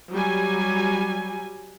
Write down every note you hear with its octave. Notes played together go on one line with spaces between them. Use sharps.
F#3 G3 G#5